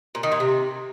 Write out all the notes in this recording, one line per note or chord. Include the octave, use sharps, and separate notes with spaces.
A#2
D#3
A#2
C3